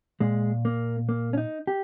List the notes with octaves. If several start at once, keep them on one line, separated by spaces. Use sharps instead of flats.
A#2 G#3
A#3
A#3
C#4
D#4
G4